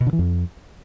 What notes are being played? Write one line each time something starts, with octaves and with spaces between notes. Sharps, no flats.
B2
D3
E3
F2